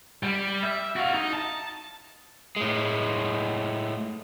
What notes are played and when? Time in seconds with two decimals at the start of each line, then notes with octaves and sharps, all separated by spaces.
0.23 G3
0.63 E5
0.96 F#4 F5
1.14 D#4
1.33 A5
2.56 A2 G#3